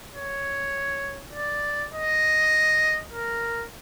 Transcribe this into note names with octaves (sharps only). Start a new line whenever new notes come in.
C#5
D5
D#5
A#4